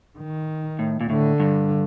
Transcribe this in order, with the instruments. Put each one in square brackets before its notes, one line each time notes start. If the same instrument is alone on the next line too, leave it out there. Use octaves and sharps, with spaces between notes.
[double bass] D#3
[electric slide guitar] A2
A#2
[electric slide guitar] A2 [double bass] D3
[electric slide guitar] G2